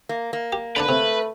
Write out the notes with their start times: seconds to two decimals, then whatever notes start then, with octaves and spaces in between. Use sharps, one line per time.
0.09 A#3
0.33 A#3
0.53 G4
0.76 D3 D4 B4 D5 A#5
0.89 C3 A3